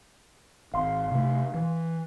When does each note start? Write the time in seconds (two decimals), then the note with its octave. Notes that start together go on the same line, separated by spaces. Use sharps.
0.74 G#1 F5 C6
1.12 C3 A3
1.54 E3